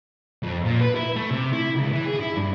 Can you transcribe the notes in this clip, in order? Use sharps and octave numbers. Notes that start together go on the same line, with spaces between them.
F2
A#2
B4
E4
A3
C3
E4
C#2
E3
G#4
E4
G2